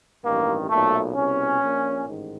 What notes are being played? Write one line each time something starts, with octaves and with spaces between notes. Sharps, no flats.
A1 G2 D#3 A#3
B1 A#2 A3
C2 B2 C#4
A#1
A#2
A1 G#2 D#3